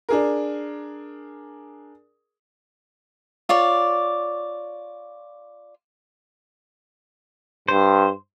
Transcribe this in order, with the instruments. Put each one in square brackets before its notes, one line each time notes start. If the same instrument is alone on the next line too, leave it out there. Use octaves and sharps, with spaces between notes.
[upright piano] D4 G#4 A#4
[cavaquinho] F4 C#5 D5
[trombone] G2 [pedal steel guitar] C5